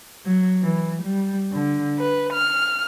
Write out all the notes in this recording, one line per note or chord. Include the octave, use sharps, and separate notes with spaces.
F#3
E3
G3
D3
B4
F6